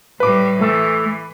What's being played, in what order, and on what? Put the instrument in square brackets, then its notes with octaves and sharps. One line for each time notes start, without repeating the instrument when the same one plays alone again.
[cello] A2 G3 [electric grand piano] B4 D6
[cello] E3 [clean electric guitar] A3